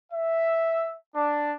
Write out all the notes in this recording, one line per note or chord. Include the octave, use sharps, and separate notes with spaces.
E5
D4